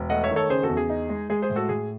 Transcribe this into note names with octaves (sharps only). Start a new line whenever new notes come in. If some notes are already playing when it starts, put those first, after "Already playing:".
Already playing: E1
A3 D#5 F#5
C#5 E5
D#3
A4 C#5
C#3 G#4 C5
F#4 A4
E2
G#4
D#4
G#3
G#3 G#4
G#4 C5
A2
F#4 A4
A2 G#4